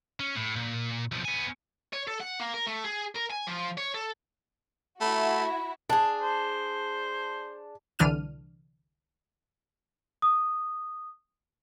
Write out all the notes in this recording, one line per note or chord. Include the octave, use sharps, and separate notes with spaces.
C#4
A2
A#2
B1 F3
B3 G#5
C#5
A4
F#5
A#3
A#4
A3
G#4
A#4
G#5
F3
C#5
A4
A3 E4 F#4 B5
D4 G#4 A5
C5
C2 D3 E3 D4 F6 D#7
D#6